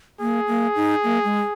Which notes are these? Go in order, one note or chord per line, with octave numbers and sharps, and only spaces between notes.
A#3 G#4
A#3
D#4
A#3
G#3